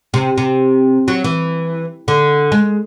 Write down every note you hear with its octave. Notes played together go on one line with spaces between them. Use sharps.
C3
C3
F#3
E3
D3
G#3